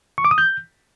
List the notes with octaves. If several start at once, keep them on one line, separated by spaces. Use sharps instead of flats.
C#6
D6
D#6
G6